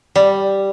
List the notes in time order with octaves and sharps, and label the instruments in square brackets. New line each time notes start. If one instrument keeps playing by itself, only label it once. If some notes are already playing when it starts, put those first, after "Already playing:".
[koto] G3